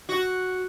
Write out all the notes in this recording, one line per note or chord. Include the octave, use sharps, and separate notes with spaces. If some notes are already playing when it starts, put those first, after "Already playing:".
F#4